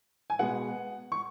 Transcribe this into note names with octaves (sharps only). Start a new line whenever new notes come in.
G#5
B2 G#3 B3 F#5
C#6